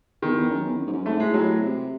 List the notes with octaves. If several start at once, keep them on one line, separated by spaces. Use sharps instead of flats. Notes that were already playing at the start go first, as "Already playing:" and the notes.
E2 D#3
E2
F#2
E2
F#2
G#2
F#2
G#2 A3
A2 G#3
A2 F#3
C3